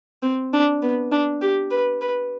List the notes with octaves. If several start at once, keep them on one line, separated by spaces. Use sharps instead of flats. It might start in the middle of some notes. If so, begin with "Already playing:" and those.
C4
D4
B3
D4
G4
B4
B4